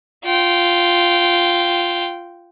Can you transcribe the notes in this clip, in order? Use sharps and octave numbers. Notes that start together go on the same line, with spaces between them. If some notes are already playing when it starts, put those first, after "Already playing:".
F4 G5